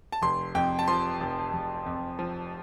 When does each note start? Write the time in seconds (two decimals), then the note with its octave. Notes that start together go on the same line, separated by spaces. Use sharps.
0.12 A5
0.22 F1 C6
0.55 F2 G5
0.79 A5
0.88 F3 C6
1.20 F1
1.53 F1
1.86 F2
2.19 F3